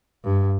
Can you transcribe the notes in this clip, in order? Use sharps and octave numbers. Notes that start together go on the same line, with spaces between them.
G2